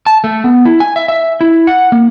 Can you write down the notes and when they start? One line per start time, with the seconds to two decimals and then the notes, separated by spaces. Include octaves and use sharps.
0.06 A5
0.24 A3
0.44 B3
0.65 E4
0.80 G#5
0.96 E5
1.08 E5
1.41 E4
1.67 F#5
1.92 A#3